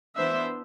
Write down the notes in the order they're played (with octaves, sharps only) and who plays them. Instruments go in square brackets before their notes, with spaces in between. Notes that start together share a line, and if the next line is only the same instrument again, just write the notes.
[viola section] E3 B3 D4 C5 E5